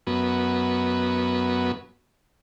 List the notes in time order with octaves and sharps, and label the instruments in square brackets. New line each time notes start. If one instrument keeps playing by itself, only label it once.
[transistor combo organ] F#2 B3